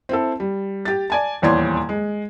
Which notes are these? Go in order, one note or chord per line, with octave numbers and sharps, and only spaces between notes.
C4 E4 A4
G3
G4 A6
D5 G#5 A5
D#1 E2 C#5 D5 C6 G#6
G#3